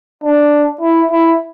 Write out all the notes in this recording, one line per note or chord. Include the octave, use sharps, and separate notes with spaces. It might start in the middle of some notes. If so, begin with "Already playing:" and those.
D4
E4
E4